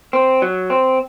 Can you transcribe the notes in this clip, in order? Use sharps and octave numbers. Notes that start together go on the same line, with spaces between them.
C4
F#3
C4